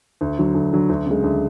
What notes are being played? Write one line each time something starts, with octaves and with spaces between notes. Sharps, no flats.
D2
D3 F#3
D2
D3 F#3
D2
C#3 G#3
D2